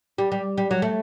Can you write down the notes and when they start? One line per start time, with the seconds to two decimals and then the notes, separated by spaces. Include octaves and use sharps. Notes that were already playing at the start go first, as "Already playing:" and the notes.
0.18 G3
0.32 G3
0.58 G3
0.71 F#3
0.82 A3